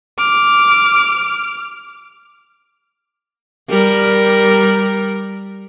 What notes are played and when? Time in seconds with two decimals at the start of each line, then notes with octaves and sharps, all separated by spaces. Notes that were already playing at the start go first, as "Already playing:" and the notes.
0.18 D6 F6
3.69 G3 A#4